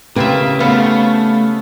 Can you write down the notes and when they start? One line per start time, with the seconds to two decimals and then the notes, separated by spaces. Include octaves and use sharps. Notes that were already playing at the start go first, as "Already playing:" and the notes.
0.16 C#3 A#3 C4 F4 G4 B4 E5
0.60 C#3 A3 B3 F5